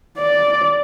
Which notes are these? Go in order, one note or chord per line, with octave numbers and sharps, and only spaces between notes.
D5